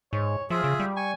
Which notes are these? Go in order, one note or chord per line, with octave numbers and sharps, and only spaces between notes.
G#2 C#5
F3 F4 G#4 E5
C#3
G3
G#5 C#6